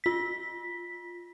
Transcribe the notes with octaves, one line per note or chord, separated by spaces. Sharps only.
F4 B6